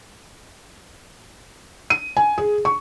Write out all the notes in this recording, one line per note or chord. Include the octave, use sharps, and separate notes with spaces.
D#7
G#5
G#4
C#6